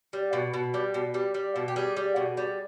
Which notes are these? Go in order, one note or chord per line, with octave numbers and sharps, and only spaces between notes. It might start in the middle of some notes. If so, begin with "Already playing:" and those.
G3
B2
B2
G3
B2
G3
G3
B2
G4
G3 G#4
G3
B2
G3